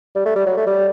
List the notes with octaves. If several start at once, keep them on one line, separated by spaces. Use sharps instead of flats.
G3
A3
G3
F#3
A3
G3